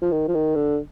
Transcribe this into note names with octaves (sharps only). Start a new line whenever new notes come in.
F3
D#3
F3
D#3
D3